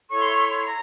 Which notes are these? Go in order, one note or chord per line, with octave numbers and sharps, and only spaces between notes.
E4 A4 C#5 C#6
C6
C#6
C6
A#5